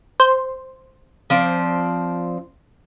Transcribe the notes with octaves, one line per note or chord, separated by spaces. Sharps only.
C5
F3 C4 D5